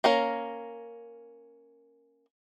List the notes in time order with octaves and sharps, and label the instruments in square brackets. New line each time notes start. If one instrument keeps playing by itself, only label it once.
[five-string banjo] A#3 C#4 A#4